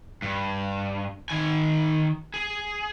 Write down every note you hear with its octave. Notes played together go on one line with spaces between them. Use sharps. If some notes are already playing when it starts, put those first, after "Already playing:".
G2
D#3 G#5
G#4